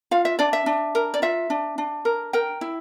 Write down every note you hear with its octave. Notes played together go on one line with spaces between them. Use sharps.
F4 F5
E5
D4 D5
E5
D4
A#4
D5
F4 E5
D4
D4
A#4
A#4 G5
E4